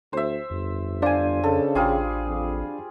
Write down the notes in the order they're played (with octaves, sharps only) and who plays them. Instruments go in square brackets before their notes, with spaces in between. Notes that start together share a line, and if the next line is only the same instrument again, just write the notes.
[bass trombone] D2 [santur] C5 E5
[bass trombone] G1 [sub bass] F2
[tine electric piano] D4 D5 F5 [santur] C5 G#5
[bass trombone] C#3 [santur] A4
[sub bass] A1 [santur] G3 F4 G#4
[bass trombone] F2